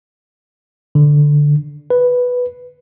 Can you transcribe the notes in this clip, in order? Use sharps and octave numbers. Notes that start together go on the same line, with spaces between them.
D3
B4